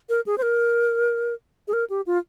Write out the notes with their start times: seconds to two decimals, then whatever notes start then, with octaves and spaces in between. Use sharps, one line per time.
0.09 A#4
0.26 G#4
0.38 C5
0.42 A#4
1.68 G#4
1.73 A#4
1.90 G4
2.07 F4